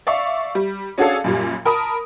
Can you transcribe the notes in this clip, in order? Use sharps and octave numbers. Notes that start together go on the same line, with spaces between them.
D5 E5 F5 C#6
G3
C#4 D4 F#4 G#4 A4 F5
F#2 A#2 G3
A#4 A5 B5 D#6